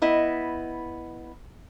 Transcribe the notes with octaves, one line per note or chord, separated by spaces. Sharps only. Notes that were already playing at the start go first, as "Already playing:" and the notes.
B3 E4 D#5